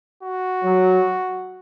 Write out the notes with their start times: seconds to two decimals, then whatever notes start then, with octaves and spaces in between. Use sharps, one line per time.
0.23 F#4
0.63 F#3